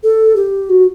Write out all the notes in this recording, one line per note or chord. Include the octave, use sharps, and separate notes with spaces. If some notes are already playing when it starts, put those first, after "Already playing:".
A4
G4
F#4